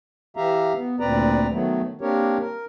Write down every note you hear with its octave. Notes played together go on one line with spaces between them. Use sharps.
E3 G4 E5 F5 A#5
B3
D2 A#2 C4 B4 D5 A#5
D#3 F#3 A3 B3
A#3 C4 D4 G4 A#4 C#5
A#4